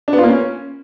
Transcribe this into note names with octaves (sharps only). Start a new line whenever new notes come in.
D4
B3
F4
A#3
C#4